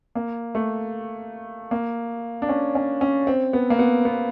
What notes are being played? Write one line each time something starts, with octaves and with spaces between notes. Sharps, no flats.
A#3
A3
A#3
D4
C#4
C#4
C#4
C4
B3
A#3
B3
B3